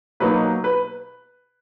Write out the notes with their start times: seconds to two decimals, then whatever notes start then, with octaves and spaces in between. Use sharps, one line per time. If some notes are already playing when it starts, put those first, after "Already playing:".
0.20 B2 F#3 A#3 D#4 B4
0.64 B4